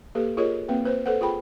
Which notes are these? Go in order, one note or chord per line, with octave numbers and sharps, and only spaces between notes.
A#3 G4 A4 B4
F4 G#4 A#4 C#5 D#5
A#3 C4 B4 G5
B4 C5
A4 B4 C5 F#5
F4 G#4 G5 B5